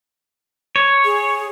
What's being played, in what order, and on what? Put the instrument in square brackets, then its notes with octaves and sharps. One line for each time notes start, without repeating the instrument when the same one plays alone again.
[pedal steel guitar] C#5
[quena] G#4